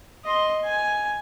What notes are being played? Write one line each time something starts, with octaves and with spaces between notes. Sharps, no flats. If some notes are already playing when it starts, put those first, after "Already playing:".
D#5 C6
G#5